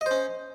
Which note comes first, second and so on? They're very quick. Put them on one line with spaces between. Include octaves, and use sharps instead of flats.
D#5 C5 C#4